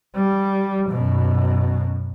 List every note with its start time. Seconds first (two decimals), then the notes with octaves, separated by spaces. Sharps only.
0.15 G3
0.90 F#2 B2